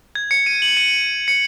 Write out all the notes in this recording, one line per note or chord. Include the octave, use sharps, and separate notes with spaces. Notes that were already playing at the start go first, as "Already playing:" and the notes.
G#6
C#7
D#7
F#7
D#7
C#7